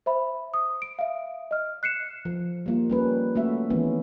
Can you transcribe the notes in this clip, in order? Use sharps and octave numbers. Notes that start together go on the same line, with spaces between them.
C5 E5 B5
D#6
D7
E5 F5
D#5 F6
F#6 C7 C#7 E7
F3
G3 A#3 F4
G3 C#4 B4
A3 A#3 C#4 F#4 E5
D#3 E3 G#3 B3 C#4